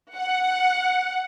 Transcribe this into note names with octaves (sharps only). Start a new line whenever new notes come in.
F#5